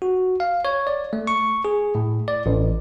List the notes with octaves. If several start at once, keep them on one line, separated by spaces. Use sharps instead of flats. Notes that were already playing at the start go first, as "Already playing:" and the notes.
F#4
F5
C#5
D5
A3
C#6
G#4
A2
D5
A1